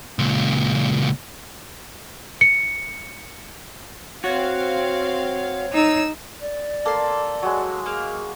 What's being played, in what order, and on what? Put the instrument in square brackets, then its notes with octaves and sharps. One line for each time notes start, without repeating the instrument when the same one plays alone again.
[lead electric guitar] C#2 A#2
[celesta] C#7
[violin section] C4 F5 [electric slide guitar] F#4 [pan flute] C#5
[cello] D#4 [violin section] E6
[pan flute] D5
[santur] A#3 [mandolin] A4 C6
[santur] F#3 G#3
[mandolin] A#3 F5 [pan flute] G#4